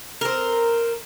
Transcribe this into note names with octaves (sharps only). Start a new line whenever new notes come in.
C4 A#4